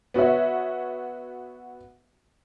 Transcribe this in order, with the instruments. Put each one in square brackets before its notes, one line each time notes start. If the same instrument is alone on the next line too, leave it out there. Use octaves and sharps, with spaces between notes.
[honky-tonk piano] B3 F#4 C#5 E5